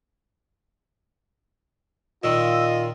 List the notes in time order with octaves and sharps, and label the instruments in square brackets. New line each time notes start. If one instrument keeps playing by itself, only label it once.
[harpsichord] A#2 D#3 [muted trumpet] F4 [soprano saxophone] D#5 [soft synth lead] E6